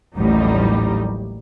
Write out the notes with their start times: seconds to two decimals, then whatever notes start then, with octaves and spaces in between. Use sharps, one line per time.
0.17 A1 D#2 A2 F#3 G3 D#4